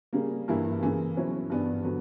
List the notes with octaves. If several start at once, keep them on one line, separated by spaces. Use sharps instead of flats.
C#3 G3 A#3
G2 E3 A#3 E4
C#3 E3 A#3
B2 F#3 C#4 E4
G2 E3 B3 D4
D3 F#3 B3